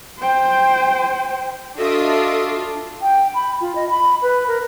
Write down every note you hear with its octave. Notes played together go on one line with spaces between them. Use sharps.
C5 G5
D4 F4 F#4 A4 D#5 E5 D#6
G5
B5
F4
D#5
B5
B4
A#4